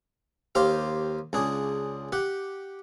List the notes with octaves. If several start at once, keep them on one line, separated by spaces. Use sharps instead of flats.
D#2 G4 C5 F5
C#2 D4 G#4
G4 F#5